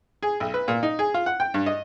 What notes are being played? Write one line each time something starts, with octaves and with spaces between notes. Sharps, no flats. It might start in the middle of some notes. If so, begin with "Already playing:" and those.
G#4
B1
B4
A#2
D#4
G#4
F4
F#5
G5
G2
D#5